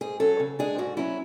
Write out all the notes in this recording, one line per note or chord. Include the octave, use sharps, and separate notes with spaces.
G#2 G#4
F#3 C#4 A4
C#3
G#3 D4 G#4
G#2 F#4
F#3 C#4 E4